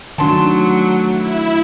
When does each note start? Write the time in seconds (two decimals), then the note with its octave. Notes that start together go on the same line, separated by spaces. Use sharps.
0.18 D#3 F#3 A3 D4 A5 C6
1.12 E4